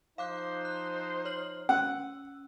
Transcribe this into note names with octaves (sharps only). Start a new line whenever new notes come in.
F3 D#4 C5 F5 D6 F#6
F#6
C#5 F6 F#7
C#4 F#5 E6